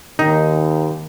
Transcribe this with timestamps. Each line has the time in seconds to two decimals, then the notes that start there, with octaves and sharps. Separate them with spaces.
0.19 D#2 D#3 D#4